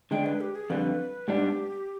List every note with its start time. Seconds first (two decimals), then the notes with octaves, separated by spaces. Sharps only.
0.11 D3 G#3 D4 G5
0.26 B4
0.41 G4
0.55 G#4
0.70 F2 D3 G3 B4
1.28 G#2 G3 B3 D4 G4